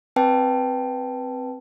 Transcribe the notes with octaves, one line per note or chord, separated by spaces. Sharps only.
C4 B4 G5 A5